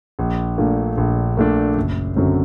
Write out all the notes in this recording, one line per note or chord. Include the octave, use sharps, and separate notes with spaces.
A#1
A#2 A3 D4
A#1
A#2 A3 D4
F#1
F#2 D3 F#3 C4